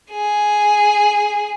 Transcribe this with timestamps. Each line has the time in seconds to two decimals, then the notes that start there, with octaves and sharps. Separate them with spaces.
0.11 G#4